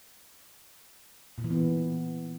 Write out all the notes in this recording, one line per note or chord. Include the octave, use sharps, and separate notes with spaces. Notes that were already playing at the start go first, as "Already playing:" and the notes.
A#2
E3
B3